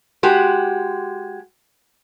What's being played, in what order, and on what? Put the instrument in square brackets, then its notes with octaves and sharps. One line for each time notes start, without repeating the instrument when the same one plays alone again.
[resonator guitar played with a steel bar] G#3 F#4 G4